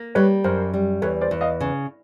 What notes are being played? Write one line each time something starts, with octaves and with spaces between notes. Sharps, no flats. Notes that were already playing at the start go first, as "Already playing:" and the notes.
Already playing: A#3
G3 B4 C#5
F#2 A#4 C5
G3
E2 B4 C#5
C5 D5
E2
D#5 F5
C#3